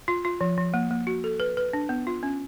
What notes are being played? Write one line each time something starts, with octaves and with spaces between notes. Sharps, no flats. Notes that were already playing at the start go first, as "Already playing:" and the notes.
F4
F4
F3
F3
A#3
A#3
F#4
A4
B4
B4
D4
B3
F4
C#4